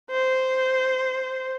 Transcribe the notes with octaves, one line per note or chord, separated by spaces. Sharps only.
C5